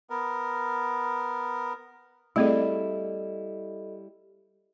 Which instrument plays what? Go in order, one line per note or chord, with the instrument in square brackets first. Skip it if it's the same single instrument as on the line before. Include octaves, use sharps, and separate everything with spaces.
[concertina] B3 A#4
[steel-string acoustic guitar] G3 E4 [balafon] A3 C4 G#4 [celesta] A4 D#5